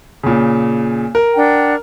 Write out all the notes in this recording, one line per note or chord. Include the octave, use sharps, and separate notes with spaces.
A#2 C#3
A#4
D4 F#5 G5